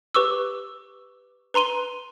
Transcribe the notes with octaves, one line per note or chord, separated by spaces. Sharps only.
G4 B4 C#6 D6 E6
B4 A#5 C6 D#7 G7